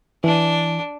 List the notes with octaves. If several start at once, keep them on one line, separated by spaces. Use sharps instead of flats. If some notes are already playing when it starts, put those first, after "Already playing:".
E3 D4